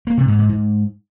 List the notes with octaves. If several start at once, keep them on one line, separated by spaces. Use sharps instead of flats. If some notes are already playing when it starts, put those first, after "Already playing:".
A#3
C3
G#2
G#2
G#2